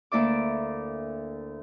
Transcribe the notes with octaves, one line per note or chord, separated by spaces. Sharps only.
D2 A#3 E4 D5 D6